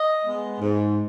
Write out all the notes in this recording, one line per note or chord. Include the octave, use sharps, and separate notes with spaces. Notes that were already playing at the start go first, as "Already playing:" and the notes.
Already playing: D#5
G#3 B3
G#2